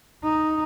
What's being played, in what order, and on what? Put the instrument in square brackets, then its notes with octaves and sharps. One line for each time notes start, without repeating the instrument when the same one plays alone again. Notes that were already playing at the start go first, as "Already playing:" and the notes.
[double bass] D#4